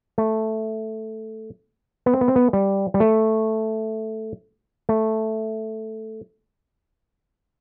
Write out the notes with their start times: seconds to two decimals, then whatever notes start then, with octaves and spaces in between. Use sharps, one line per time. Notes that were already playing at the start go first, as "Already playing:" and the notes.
0.18 A3
2.06 B3
2.14 C4
2.21 B3
2.28 C4
2.36 B3
2.53 G3
2.94 G3
3.00 A3
4.89 A3